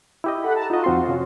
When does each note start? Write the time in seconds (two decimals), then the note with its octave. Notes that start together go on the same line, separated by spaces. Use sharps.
0.24 E4 G4 D#5
0.42 A4 F#5 B5
0.55 A5 A#5
0.70 D#4 F4 F#4 D#5
0.84 F2 C4 C6
1.08 C3 C#4